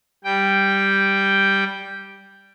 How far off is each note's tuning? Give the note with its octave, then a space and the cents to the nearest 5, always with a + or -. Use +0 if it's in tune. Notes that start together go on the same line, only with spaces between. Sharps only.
G3 +0 G5 +0